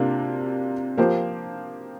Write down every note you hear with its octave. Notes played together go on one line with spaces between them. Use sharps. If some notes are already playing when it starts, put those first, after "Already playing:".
Already playing: C3 A#3 D4 F4
F3 A#3 G4 C5